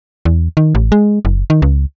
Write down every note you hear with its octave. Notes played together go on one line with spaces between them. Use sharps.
E2
D#3
A1
G#3
F#1
D#3
C#2